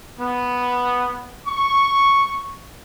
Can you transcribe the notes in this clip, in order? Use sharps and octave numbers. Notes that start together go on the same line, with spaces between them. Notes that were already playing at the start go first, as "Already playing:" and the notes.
B3
C#6